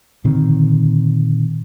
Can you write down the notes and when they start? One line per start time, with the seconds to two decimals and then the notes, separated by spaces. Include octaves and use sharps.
0.24 A#2 D3 D#3 C4